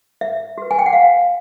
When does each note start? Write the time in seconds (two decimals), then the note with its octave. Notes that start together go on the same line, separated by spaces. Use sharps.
0.21 E5
0.58 F#4 B4
0.71 G#5
0.79 G5
0.86 F#5
0.93 F5